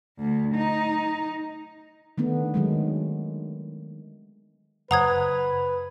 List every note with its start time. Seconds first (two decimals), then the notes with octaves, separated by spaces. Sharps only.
0.19 D2
0.56 D#4
2.18 D#3 A3 B3 D4
2.54 D#3 F#3 G#3
4.91 F#1 B4 C5 F#5 A#5 D#6 G#6